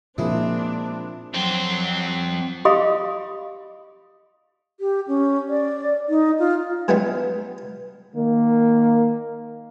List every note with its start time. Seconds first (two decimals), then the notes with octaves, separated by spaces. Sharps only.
0.18 A#2 F3 G#3 A#3 C4 D4 E4 F4
1.34 F2 F#3 C4
2.65 G4 G#4 D#5 F5 B5 D#6
4.80 G4
5.08 C#4
5.49 D5
6.09 D#4
6.39 F4
6.88 E3 F#3 G3 B3 C#4 D#4
8.16 D#3 A#3